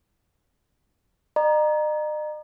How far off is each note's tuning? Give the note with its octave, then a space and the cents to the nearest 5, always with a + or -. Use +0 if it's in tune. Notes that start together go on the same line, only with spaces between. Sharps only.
D#5 -45 A#5 +10